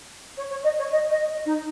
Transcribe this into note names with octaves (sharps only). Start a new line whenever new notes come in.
C#5
C#5
D#5
C#5
D#5
D#5
D#4